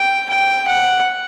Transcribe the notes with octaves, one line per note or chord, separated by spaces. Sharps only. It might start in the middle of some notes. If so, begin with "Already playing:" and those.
Already playing: G5
G5
F#5